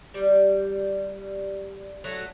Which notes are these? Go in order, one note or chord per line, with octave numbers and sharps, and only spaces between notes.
G3
F#3 A3